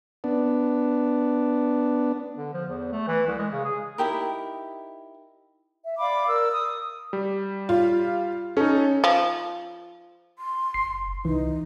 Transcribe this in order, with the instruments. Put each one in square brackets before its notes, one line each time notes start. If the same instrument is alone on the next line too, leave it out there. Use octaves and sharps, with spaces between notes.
[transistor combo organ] B3 D4
[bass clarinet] D3
F3
E2
A3
E3
C2
G#3
C#3
G#4
[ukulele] D#4 E4 G4 A#4
[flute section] E5
D5 F5 B5 D6
A#4 D5 E6
D#6
[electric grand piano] G3
[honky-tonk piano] F4
[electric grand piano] C#4 D#4 [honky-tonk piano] A4
[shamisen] F3
[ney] C6
[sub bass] F#1 [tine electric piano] C7
[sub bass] C2 [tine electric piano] E3 [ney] D#4